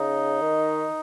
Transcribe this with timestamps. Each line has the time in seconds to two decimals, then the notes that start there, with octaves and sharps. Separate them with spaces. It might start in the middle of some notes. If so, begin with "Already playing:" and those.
Already playing: C#3 D#4
0.41 D#3